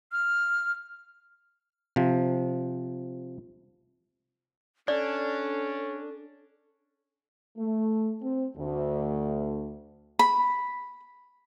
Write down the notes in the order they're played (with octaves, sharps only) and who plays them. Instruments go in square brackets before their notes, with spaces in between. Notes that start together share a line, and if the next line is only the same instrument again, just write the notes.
[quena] F6
[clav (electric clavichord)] C3 F3
[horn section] C#4 [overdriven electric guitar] D4 [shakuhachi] A4 [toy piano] D5
[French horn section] A3
C4
D2
[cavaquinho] B5